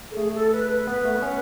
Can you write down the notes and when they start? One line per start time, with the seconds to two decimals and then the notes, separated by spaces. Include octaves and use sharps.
0.11 A4
0.16 A3 G#4
0.34 A4
0.52 B4
0.87 B3
1.05 A3
1.15 B3
1.22 C#4